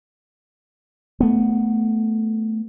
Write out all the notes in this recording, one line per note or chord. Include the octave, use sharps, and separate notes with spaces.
A3 B3